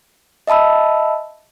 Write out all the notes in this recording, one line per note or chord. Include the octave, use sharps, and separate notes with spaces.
D#5 E5 A5 B5 E6